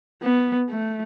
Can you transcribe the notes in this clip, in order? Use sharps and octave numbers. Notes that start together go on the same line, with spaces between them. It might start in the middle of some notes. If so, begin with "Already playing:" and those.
B3
A3